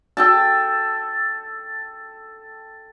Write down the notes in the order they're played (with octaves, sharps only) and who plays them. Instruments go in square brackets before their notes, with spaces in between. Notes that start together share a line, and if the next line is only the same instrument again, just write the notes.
[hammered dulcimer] A4 G5 A5